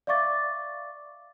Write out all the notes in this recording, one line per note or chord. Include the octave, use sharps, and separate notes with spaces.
D5 E5 F5 C#6 D6 A6